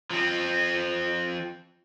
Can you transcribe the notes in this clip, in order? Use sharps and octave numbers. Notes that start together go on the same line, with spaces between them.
F3 C4